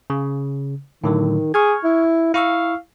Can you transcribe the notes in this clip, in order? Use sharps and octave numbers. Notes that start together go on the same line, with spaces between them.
C#3
A2 D3 D#3 F#3
G#4 C#6 F6 G#6
E4
E4 F5 C#6 E6